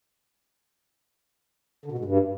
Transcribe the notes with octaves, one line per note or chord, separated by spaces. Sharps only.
D3
B2
G#2
G2